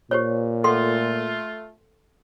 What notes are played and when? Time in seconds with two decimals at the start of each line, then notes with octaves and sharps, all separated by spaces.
0.11 A#2 G4 C5 C#5
0.64 A3 F4 A4 F#5 C6